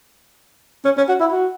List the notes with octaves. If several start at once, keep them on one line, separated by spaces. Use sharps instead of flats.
C#4
C#4
F#4
E4
F#4